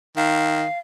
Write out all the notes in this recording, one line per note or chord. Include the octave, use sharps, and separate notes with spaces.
D#3 F5